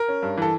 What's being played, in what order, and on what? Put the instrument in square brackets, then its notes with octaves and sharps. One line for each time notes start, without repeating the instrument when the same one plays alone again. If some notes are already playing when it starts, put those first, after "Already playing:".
Already playing: [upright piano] A#4
C#4
G2
E3 A4